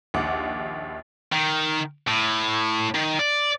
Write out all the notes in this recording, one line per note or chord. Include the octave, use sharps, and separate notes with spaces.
A#1 D#2 F#5 D6
D#3
A2
D#3
D5